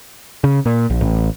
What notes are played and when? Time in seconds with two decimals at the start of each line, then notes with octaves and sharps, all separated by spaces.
0.44 C#3
0.66 A#2
0.90 A#1
1.01 A1